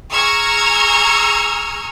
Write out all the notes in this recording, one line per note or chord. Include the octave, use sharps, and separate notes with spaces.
G#4 A#5 C#6 E6 F6 G#6